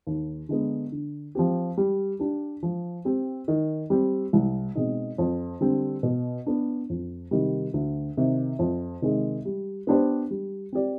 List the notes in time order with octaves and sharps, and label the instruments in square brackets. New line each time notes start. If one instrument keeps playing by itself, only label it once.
[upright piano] D#2
D3 G#3 B3
D3
F3 C4 G4
G3
D4 G4
F3
C4 G4
D#3
G3 C4
C2
B2 G#3 C4 D#4
F2
D3 G3 C4
B2
B3 D4
F2
C3 D#3 G3
D2
C3 D#3
F2
C3 D#3 G#3
G3
B3 D4 G4 C5
G3
C4 G4 D5